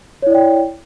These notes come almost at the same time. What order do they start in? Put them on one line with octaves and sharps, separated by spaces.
C#5 E4 D5 G5